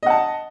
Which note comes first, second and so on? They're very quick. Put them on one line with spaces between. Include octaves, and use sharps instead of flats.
D#5 F#5 A5